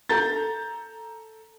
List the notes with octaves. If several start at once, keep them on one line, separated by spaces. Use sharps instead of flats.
A4 A#5 G6 A6